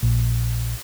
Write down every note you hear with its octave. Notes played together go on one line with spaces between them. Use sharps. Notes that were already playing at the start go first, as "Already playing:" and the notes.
A#1